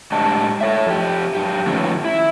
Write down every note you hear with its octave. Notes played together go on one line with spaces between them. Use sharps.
A2 G#3 D4 G4 D#5 A5
A4 C#5 E5
F2 G4
F#2 G4
D#3 F3 A3 B3 C#4
E4